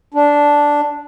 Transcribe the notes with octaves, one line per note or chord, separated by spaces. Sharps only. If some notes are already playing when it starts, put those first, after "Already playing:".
D4